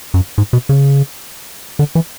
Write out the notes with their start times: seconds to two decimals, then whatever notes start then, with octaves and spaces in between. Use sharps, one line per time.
0.14 F#2
0.38 G#2
0.53 B2
0.69 C#3
1.79 D3
1.95 E3